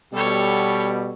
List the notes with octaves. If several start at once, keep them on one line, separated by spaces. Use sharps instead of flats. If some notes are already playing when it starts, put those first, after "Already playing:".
B2 G3 A4 C#5